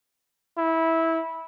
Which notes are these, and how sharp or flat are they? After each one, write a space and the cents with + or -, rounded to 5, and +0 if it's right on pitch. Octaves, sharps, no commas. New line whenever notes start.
E4 -15